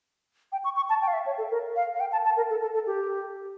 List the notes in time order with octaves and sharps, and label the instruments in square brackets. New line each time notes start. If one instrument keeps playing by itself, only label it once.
[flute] G5
C#6
C#6
A5
G5
F5
E5
C#5
A4
A#4
F5
F5
G5
A5
A5
A#4
A4
A4
A4
G4